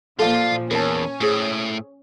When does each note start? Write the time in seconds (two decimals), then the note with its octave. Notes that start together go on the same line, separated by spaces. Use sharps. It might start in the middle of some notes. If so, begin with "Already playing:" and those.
0.19 A#2 F3 F4 A4 D5 F5
0.71 E2 C#4 A#4 A5
1.21 A2 G#4 C5